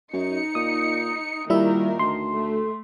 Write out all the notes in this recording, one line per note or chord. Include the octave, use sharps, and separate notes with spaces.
F#2 D#4 C#7
A#2 D#6
A#2 D#3 G3 E4 A#4 E5
D2 C6
A3